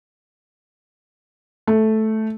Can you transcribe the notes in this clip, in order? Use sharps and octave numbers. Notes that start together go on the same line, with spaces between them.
A3